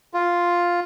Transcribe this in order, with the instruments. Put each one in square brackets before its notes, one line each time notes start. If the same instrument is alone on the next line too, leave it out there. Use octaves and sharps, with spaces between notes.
[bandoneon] F4